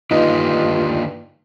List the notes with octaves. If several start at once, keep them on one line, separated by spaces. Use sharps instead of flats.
G2 D3 D#3 A#3 D#4 F4